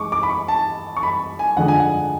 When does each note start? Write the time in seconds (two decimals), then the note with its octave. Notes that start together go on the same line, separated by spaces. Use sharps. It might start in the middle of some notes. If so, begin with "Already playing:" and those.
Already playing: G#3 C#6 D6
0.12 D6
0.23 B5
0.30 C#6
0.48 A5
0.97 C#6
1.03 B5
1.39 G#5
1.57 F2 D3 G#3 D4 F#5
1.68 G#5
1.79 F#5